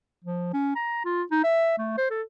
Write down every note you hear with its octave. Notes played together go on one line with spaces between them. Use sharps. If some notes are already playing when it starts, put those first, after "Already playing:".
F3
C#4
A#5
F4
D#4
E5
A3
C5
A4